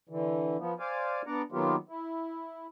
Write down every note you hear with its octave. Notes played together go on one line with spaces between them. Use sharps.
D3 E3
F3 B3
C5 D5 F5 G#5
B3 D4 D5 F#5 A#5
D#3 F#3 A#3 B3 F4 G4
E4